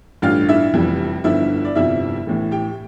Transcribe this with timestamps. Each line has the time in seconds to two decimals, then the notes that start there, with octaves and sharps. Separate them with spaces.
0.22 A1 G2 D3 F4 F5
0.49 E4 E5
0.73 F1 F2 E3 G3
1.24 G1 G2 D3 F3 E4 E5
1.65 D5
1.75 G1 F2 C3 F3 E4 E5
2.27 A1 A2 E3
2.51 G4 G5